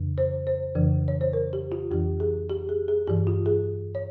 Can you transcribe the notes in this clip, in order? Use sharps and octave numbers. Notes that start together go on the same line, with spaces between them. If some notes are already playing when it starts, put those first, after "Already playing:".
Already playing: F2 C#3 E3
C5
C5
F2 C#3 E3
C#5
C5
A#4
G4
F4
F2 E3 G4
G#4
G4
G#4
G#4
G2 E3 G4
F4
G#4
C#5